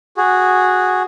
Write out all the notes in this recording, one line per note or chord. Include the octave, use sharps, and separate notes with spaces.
F#4 G#4